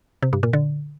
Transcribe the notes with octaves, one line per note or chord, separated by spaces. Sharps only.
C3
G2
A#2
D3